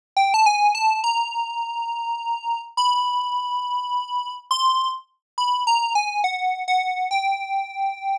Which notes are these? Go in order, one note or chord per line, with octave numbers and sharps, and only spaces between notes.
G5
A5
G#5
A5
A#5
B5
C6
B5
A#5
G#5
F#5
F#5
G5